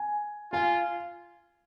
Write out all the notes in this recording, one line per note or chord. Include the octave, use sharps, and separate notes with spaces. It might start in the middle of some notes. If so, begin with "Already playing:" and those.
Already playing: G#5
F4 G#5